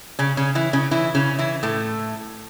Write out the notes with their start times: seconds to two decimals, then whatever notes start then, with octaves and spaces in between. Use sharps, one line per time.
0.19 C#3 C#4
0.37 C#3 C#4
0.55 E3 E4
0.73 C#3 C#4
0.91 E3 E4
1.15 C#3 C#4
1.39 E3 E4
1.63 A2 A3